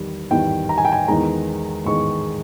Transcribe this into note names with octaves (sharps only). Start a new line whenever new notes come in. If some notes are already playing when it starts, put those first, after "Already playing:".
Already playing: E2 D#3 G3
E2 D#3 G3 G5
A#5
G#5
G5
G#5
E2 D#3 G#3 A#5
E2 D#3 G#3 C#6